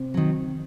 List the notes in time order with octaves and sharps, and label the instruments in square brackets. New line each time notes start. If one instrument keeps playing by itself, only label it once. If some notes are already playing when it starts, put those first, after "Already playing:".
Already playing: [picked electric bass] C3
[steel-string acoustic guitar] D#3 F#3